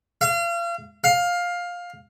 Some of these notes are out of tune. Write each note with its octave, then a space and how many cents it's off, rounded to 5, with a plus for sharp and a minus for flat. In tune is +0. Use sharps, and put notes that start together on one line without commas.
F5 -35
F5 +15